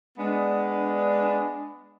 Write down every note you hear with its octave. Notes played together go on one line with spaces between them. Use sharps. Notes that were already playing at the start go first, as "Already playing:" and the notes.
G#3 B3 D4